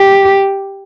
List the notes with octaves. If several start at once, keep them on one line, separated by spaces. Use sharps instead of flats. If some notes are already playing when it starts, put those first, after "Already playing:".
Already playing: G4